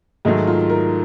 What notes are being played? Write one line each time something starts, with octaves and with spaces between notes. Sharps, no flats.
G#2 D#3 F#3 A3 D#4
F4
A#4